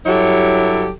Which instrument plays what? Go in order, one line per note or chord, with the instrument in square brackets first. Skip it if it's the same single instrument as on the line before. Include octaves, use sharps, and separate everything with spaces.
[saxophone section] G2 F#3 E4 G4 A4 C#5